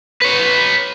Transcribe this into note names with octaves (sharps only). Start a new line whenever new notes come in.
B4 C#5